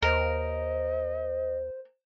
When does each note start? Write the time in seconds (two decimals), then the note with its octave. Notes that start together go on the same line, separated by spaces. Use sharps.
0.02 D#2 A#4 C5 D#5